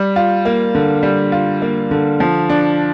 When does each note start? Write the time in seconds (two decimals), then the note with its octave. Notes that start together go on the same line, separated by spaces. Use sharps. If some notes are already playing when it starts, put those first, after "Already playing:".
Already playing: G3
0.16 F4
0.45 A#3
0.75 D3
1.03 G3
1.32 F4
1.62 A#3
1.91 D3
2.20 F3
2.50 D4